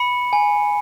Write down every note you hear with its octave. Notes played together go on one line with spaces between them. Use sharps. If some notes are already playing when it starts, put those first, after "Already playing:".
Already playing: B5 C#7
G#5